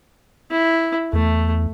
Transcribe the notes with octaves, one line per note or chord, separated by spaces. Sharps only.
E4
E2 A3